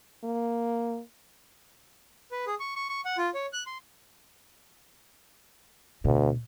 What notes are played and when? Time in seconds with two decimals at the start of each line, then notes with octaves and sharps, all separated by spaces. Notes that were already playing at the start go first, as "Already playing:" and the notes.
0.24 A#3
2.32 B4
2.47 G#4
2.60 C#6
2.76 C#6
2.89 C#6
3.05 F#5
3.18 F4
3.35 C#5
3.53 F#6
3.67 C6
6.04 D2 B2